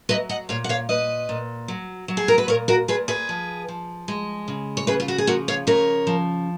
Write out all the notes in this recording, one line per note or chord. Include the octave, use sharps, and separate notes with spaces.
F#3 B4 D#5
D#5 F#5
A#2 C#5 F5
F#5
C#5 F5
A#2 B4 D#5
A#2
F#3
F#3
G#4
A#4
B4
A#2 A#4 C#5
F#4 A#4
A#2 G#4 B4
G#4 B4
F3
F3
G#3
C#3
C#5
C#3 G#4 B4
F4
F#4
G#4
F3 F#4 A#4
C#5 F5
C#3 A#4 C#5
F3